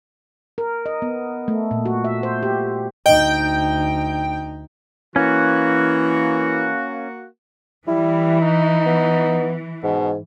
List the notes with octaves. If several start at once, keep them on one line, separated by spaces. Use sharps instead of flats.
A#4
D#5
B3
A3
A#2
F#4
E5
C5
G4
D2 D#4 D#5 G5
E3 A#3 C#4 F#4
E3 G3 E4
D#4
B3
G#2 B2